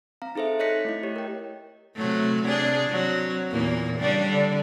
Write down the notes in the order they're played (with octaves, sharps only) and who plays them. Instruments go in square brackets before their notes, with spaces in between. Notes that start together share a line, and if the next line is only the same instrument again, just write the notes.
[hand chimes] C4 F5 A#5
D#4 G#4 A4 C5 E5
C#5 D#5 F#6 A#6 B6 C#7
A3 E4 D#5
G4 C#5
A#4 G5
[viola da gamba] C3 F#3 A3
C3 D4 G#4
F#3 C4
E2 A#2 A#3
C#3 G3 D4
D3